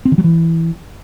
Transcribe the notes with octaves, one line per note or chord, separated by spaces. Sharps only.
C4
D#3
F#3
E3